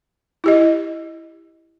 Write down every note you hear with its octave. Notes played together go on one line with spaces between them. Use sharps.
E4 G4 D#5